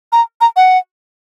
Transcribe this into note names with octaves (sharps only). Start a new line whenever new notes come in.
A#5
A#5
F#5